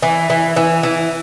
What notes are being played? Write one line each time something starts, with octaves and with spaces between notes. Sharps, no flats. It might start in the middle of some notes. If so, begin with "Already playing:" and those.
E3
E3
E3
E3